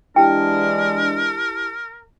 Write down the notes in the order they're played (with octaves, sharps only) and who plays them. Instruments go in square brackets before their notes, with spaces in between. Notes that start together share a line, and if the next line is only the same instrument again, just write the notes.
[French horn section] E3 G#3 D4 [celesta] E4 G4 A5 [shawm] A#4 [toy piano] G5